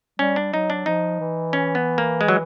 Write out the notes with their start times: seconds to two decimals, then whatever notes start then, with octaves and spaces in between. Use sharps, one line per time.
0.19 G3 C#4
0.36 D4
0.53 F#3 D#4
0.70 D4
0.86 F3 D#4
1.20 E3
1.53 C#4
1.75 B3
1.98 A#3
2.21 G#3
2.28 F#3